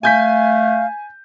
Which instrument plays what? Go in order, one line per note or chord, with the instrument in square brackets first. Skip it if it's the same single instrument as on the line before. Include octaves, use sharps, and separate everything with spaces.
[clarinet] A3 [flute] F5 [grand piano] G#5 G6 B6